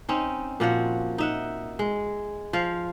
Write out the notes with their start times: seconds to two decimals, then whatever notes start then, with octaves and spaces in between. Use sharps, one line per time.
0.09 C4 C#4 D#4
0.60 A#2 F3 F#4 F#5
1.18 D#4 E5 F#5
1.79 G#3
2.53 F3 F5